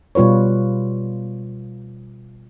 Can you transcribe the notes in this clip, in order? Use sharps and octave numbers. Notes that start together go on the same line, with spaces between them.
B2 G3 F4 B4 C#5